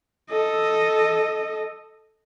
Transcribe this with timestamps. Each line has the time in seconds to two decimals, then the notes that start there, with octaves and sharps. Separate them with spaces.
0.31 A4 D#5